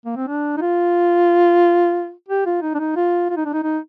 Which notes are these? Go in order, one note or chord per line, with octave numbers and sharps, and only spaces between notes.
A#3
C4
D4
D#4
F4
G4
F4
D#4
D4
D#4
F4
F4
D#4
D4
D#4
D#4